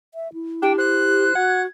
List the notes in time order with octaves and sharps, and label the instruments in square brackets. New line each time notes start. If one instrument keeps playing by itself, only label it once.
[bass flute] E5
E4
[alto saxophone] D4 [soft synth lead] G4 [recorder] G5
[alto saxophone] C5 [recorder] F#6
[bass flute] F#4 [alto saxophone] F#5 [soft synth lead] G#6